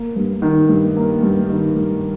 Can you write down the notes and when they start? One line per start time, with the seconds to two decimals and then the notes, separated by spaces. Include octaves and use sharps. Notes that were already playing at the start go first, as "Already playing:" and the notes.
Already playing: A#3
0.16 G2
0.42 D#3
0.69 G2
0.96 A#3
1.23 G2
1.50 D#3
1.76 G2